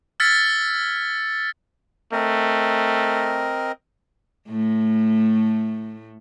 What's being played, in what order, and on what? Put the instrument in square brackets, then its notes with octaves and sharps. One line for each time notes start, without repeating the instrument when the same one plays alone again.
[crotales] E6 F6 G#6 A6 B6 C#7
[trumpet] A3 [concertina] C4 A#4 D#5
[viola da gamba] A2 A3